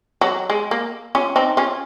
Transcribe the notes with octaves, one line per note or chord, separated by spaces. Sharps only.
F#3
G#3
A#3
C#4 F4
C4 D#4
C#4 F4